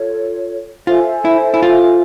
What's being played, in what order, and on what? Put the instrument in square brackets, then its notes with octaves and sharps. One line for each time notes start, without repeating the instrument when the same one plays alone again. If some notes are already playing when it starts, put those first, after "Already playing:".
Already playing: [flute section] F4 A4 C#5
[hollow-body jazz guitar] F4 [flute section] A4 C5 E5 G#5
[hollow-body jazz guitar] E4
E4
F4